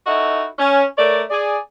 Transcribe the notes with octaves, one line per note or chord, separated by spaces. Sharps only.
D#4 E4 F#4 A4 D#5
C#4
A3 A#4 C#5 D5
G#4 D5